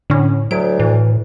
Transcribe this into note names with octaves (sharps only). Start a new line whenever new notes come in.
A2 D3 C#4
D2 F#3 D7
A2 E3